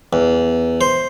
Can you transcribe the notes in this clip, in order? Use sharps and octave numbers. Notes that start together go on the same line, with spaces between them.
E2
C5